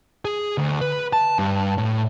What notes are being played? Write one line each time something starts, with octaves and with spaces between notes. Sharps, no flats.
G#4
D2
B4
A5
G2
A2